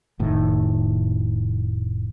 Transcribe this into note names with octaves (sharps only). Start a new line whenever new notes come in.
F1 A2 D#3